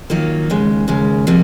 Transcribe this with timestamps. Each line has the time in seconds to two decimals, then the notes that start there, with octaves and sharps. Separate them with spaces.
0.10 D#3 F#3 A#3 F4
0.50 D#2 C#3 G#3
0.88 D#2 C#3 G#3
1.27 C3 F3 A#3